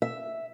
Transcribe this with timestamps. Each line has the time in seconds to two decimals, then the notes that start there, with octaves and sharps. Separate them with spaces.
0.02 E5